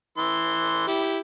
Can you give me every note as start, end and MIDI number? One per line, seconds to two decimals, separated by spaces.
0.18 0.83 52
0.18 0.83 84
0.87 1.18 64
0.87 1.18 67